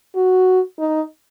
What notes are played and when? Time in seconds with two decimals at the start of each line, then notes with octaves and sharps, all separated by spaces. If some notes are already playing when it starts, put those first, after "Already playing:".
0.16 F#4
0.79 D#4